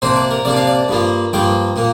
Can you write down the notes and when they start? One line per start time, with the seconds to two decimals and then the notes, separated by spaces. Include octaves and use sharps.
0.02 C3 A#3 D4 C5
0.16 D5
0.31 A#4
0.45 C3 A#3 D4 D5
0.56 F5
0.67 D5
0.88 G2 F3 A#3
1.33 G2 F3 A#3 G5
1.76 A#2 A#3